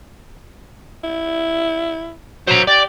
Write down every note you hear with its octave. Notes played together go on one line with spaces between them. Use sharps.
E4
F#3 C5 A#5
G4 D5